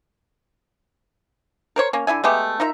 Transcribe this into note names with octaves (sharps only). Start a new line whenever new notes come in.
A#4 C5 C#5
A#3 C#4
D3 E4 E5 G#5
G#3 A3 B3 G4
D#4 F4 A#4 E5